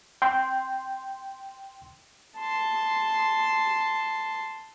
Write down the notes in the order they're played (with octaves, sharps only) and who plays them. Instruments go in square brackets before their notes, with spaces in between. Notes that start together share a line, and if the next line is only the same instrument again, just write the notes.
[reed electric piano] G5 C6
[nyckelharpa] A5 C6